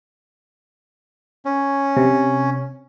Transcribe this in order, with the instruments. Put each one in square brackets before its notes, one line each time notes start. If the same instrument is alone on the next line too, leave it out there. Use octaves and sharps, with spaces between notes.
[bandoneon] C#4
[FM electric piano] C3